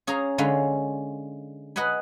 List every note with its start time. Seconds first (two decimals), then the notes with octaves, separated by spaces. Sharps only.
0.07 C#4 G#4 F5 A#5
0.38 D3 G#3 C#4 F4 F5 B5
1.76 B4 D#5 F#5 G#5 B5